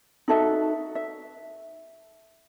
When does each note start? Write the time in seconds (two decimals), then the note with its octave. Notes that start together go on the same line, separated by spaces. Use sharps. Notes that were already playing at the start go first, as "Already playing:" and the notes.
0.28 D#4 F#4 A4 E5
0.95 E5